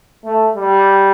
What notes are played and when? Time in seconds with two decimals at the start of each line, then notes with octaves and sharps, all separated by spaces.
0.25 A3
0.55 G3